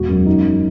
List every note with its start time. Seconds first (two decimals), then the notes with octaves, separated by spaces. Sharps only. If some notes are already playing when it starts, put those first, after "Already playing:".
Already playing: E1 F#4
0.09 F#2
0.26 D#4
0.44 F#2